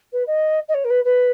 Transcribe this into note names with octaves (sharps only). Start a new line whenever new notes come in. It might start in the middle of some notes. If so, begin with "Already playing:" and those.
B4
D#5
D#5
C#5
A#4
B4
B4